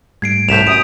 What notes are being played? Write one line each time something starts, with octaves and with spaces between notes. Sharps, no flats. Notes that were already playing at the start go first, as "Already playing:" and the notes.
G#2 G3 A3 G#6 C7 D7
C2 A2 G6 B6 E7 F7
F#2 D#6 D7